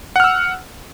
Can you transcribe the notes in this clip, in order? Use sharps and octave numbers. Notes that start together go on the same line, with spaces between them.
F#5 E6 F6